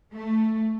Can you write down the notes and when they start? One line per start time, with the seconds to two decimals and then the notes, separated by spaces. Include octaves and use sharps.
0.15 A3